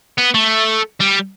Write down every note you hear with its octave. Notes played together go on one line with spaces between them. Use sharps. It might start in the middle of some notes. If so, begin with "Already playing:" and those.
B3
A3
G3